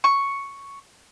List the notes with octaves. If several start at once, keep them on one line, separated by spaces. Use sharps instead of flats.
C#6